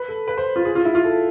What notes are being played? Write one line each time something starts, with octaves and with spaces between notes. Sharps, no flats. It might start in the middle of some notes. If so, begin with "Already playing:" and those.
Already playing: B4
A4
B4
C5
F4
G#4
F4
E4
F4
A4